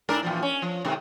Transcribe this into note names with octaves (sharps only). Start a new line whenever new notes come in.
G#2 D4 A#4
A#2 E3 F3
C#4
F3
G#2 C3 D#3